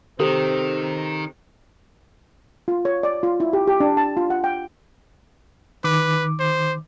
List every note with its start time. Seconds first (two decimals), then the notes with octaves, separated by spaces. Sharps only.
0.20 C3 D#3 C4 A4
2.68 F4
2.85 C#5
3.03 D5
3.23 F4
3.40 E4
3.53 G4
3.67 G4
3.80 D4
3.97 A5
4.17 F4
4.30 F#5
4.44 G5
5.84 D#3 B4 D6
6.40 C5